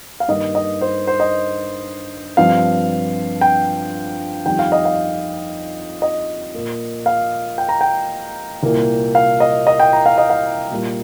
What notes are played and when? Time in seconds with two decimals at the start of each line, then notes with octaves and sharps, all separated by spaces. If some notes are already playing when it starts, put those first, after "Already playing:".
0.20 F5
0.28 G2 D#3 A#3 D#5
0.55 D#5
0.81 C5
1.07 C5
1.20 D#5
2.37 G2 F3 C4 F5
3.41 G5
4.46 F2 D#3 G3 G5
4.59 F5
4.72 D#5
4.85 F5
6.02 D#5
6.54 A#2 A#3
7.06 F5
7.58 G5
7.69 A#5
7.81 G5
8.63 C2 A#2 A#3
9.15 F5
9.40 D#5
9.67 D#5
9.80 G5
9.93 A#5
10.06 F5
10.18 D#5
10.30 F5
10.71 A#2 G3 A#3